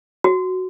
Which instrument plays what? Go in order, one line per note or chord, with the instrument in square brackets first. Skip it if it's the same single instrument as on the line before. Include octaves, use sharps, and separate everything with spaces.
[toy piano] F#4